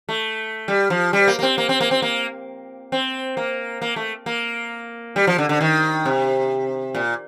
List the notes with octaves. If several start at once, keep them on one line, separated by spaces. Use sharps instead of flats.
A3
G3
F3
G3
A#3
A#3
C4
A#3
C4
A#3
C4
A#3
C4
A#3
A#3
A3
A#3
G3
F3
D3
D3
D#3
C3
A#2